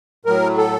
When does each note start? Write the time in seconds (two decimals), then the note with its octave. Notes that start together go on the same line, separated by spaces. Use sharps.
0.25 A2 F#3 A#4
0.58 A4